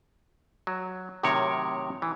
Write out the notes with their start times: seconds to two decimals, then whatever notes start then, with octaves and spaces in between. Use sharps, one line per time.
0.67 F#3
1.23 A2 C3 D#3 F#3 A#4 C#5
2.02 E3